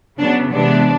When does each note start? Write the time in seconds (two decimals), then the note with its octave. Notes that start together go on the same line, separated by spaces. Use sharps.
0.19 C#3 F#3 B3 D4
0.53 C3 E3 G#3 B3 D4